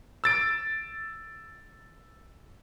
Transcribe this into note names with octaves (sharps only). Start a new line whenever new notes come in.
E6 A6 D7